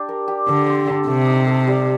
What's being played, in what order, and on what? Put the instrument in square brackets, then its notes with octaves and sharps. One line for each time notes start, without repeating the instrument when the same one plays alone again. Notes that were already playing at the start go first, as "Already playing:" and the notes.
Already playing: [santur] D4 G4
A#4
G4
[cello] D3 [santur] A4
[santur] C4
A4
[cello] C3 [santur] A3
[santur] D#4
A4
G3